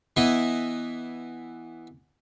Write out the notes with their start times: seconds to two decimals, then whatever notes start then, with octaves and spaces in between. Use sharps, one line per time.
0.17 E3 B3 E4 D#5